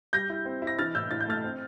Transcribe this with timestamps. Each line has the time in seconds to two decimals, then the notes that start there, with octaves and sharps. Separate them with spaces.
0.13 G3 G6 A#6
0.30 E4
0.45 C4
0.62 E4
0.67 A#6
0.79 E3 F6 A6
0.95 A2 E6 G6
1.11 A2 A6
1.20 G6
1.27 A3 F6 A6
1.44 C4